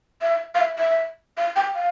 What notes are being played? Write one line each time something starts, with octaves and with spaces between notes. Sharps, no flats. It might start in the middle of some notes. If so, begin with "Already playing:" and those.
E5
F5
E5
E5
F5
G5
F5